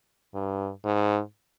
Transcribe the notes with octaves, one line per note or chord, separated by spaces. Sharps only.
G2
G#2